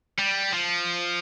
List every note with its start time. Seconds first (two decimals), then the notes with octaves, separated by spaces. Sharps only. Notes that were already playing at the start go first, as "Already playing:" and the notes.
0.18 G3
0.53 F3